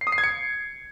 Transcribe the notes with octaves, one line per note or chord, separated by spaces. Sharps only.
C7
D#6
C7
G#6
C#7